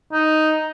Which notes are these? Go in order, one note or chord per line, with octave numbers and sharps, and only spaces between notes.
D#4